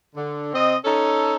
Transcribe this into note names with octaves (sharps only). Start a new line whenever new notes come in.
D3
C3 C4 D#5
C#4 D#4 A4